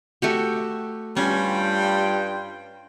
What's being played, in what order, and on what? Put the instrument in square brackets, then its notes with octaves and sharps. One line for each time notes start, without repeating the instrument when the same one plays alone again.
[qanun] A3 F#4 G4
[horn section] G2 F4 G5 [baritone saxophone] G3 [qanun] C#4